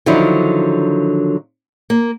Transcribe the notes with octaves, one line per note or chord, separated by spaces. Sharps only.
D3 D#3 F3 F#3 D4 E4
A#3